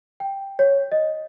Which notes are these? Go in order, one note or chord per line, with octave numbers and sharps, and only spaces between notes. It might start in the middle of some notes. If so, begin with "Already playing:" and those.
G5
C#5
D#5